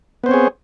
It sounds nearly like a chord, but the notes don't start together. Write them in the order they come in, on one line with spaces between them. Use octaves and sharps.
B3 C5 C4 C#5 G#4